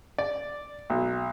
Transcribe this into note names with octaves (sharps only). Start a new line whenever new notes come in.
D5
B1